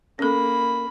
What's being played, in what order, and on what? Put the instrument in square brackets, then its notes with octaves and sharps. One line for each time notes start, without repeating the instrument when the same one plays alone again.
[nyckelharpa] A#3 B5 [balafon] C#4 A4